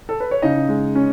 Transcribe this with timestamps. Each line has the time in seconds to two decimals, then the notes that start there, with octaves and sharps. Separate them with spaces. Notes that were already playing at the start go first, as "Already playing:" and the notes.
0.09 A4
0.20 B4
0.31 C#5
0.42 C#3 D#4 D#5
0.69 G#3
0.95 C#4